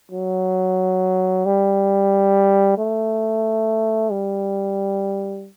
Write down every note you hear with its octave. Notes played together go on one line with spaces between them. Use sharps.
F#3
G3
A3
G3